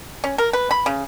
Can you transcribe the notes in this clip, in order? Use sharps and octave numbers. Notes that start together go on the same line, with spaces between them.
C#4
A#4
B4
B5
C#3